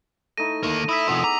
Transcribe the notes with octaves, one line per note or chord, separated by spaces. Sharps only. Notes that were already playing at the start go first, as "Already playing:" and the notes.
A3 D#4 E4 A#6 D#7
D#3 A#3
E4 D#6 E6 B6
C3 F3 B3 G#4
A#5 D6